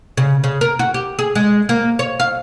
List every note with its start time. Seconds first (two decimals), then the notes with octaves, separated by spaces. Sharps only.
0.17 C#3
0.44 C#3
0.61 A#4
0.79 F#4
0.94 G4
1.19 G#4
1.35 G#3
1.69 A#3
1.99 C#5
2.20 F5